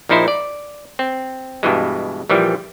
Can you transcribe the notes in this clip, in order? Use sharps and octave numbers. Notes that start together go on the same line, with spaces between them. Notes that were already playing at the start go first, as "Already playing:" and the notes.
A#1 F3 D#4 E4 C5
D5
C4
G2 B2 E3 G#3
A#1 E3 F3 G3